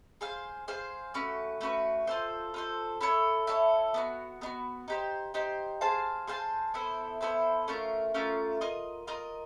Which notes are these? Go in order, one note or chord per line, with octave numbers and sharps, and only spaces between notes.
G#4 C5 F5
G#4 C5 F5
A3 C#4 F#4 B4
A3 C#4 F#4 B4
F4 A4 C5
F4 A4 C5
E4 A4 C#5
E4 A4 C#5
B3 D4 F#4
B3 D4 F#4
D#4 G4 C5
D#4 G4 C5
G#4 C5 F5 A5
G#4 C5 F5 A5
B3 E4 A4 C5
B3 E4 A4 C5
A3 C#4 F4 A#4
A3 C#4 F4 A#4
F4 A#4 D#5
F4 A#4 D#5